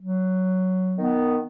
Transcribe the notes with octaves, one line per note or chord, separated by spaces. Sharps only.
F#3
D#3 B3